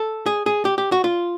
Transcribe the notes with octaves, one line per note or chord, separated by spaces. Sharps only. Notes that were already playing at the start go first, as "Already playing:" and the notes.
Already playing: A4
G#4
G#4
G4
G4
F#4
F4